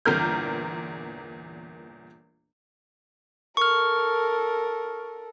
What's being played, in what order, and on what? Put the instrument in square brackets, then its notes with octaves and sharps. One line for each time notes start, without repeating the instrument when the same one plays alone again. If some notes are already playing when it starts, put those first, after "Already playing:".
[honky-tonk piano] G1 E2 A#2 A#4 F6 G6
[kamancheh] A4 A#4 [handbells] C#6 F6